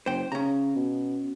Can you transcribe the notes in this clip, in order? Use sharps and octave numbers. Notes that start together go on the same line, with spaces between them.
F#1 C5 G5
C#3 C#4 A#5
B2